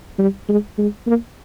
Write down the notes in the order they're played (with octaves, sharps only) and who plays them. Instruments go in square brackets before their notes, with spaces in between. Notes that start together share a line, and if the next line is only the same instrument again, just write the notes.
[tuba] G3
G#3
G#3
A#3